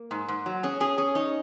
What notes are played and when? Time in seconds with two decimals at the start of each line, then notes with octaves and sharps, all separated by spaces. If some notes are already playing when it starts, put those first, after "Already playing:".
Already playing: A#3
0.11 G#2
0.28 G#2
0.46 F#3
0.63 C#4 G#4
0.80 C#4 G#4
0.98 C#4 G#4
1.15 D#4 C#5